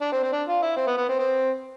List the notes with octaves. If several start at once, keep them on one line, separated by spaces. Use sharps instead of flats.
D4
C4
C4
D4
F4
E4
C4
B3
B3
C4
C4